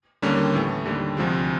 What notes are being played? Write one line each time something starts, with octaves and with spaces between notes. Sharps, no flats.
D#2 D3 G3 A#3 C#4
A2 E3 A3
D#2 D3 G3
D2 C3 F3 G#3